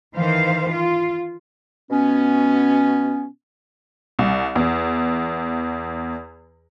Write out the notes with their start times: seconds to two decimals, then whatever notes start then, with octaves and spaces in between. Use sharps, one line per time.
0.17 D#3 E3 C5 F5
0.71 F4
1.91 B2 B3 C#4
4.19 C2
4.55 E2